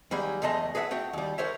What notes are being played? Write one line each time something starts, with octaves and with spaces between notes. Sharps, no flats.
D#2 F#3 G3 G#4 B5
E2 G#3 A3 D#5 A5 C6
G#4 B4 C#5 E5 F#5
A3 F#4 F#5 G5
D#2 G3
F#4 A#4 C5 C#5 E5